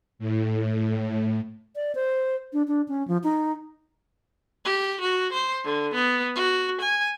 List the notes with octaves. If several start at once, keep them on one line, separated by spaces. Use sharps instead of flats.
A2
D5
C5
D4
D4
C#4
F3
D#4
G4
F#4
C5
D3
B3
F#4
G#5